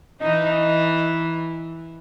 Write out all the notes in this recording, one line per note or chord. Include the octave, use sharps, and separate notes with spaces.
E3 D#4